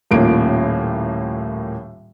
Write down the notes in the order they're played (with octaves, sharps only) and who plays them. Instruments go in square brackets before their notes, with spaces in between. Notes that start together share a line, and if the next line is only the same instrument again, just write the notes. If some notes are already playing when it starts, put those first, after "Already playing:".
[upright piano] D#1 A2 F3 A#3 D7